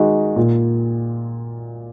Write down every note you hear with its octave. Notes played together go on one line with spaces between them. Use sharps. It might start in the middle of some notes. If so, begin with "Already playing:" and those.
Already playing: D#3 G#3 D#4 F#4
A#2